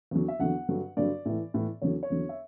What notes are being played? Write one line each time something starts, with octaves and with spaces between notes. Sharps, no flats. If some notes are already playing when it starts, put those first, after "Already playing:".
E2 D3 F#3
E5
E2 D3 F#3 F#5
G2 D3 F#3
G2 D3 F#3 D5
A2 E3
A2 E3
E2 D3 F#3 C#5
C#5
E2 D3 F#3
E5